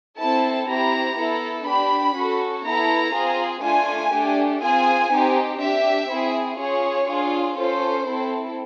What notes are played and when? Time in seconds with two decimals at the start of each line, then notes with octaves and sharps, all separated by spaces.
0.19 C4 E4 A4 A5
0.68 C4 E4 G4 A#5
1.17 B3 E4 A4
1.66 D4 G4 B5
2.15 C#4 F#4 A4
2.64 B3 E4 A4 A#5
3.14 C4 F4 G#4
3.63 A3 D4 F4 G#5
4.13 A3 D4 G4
4.61 C4 F4 G#4 G#5
5.11 C4 D#4 G4
5.60 D4 G4 E5
6.09 C4 E4 G#4
6.59 C#4 F4 G#4 C#5
7.07 D4 F4 G#4
7.57 C#4 F4 A4 C5
8.06 C4 E4 A4